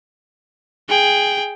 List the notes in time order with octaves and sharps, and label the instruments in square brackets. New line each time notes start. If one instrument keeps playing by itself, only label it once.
[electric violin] G#4 G5